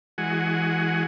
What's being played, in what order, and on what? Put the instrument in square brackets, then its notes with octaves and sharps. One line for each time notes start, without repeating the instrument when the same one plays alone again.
[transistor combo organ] E3 G#3 F#4 F#5 G#5